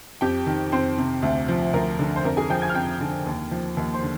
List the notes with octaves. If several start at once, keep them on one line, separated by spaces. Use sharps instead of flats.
F2 G4 G5
D#3
F2 C4 C5
C3
D2
F3
D2 A#4
D3
C5
F2 A#4
G#4 G#5
F3 G5 G6
G#5 G#6
F6
F2 G5 G6
D3
D#2
F3
D#2
C5 C6
D3